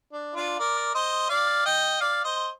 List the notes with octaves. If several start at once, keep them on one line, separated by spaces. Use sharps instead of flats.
D4
D4 F4
A#4 D5
C5 D#5
D5 F5
D#5 G5
D5 F5
C5 D#5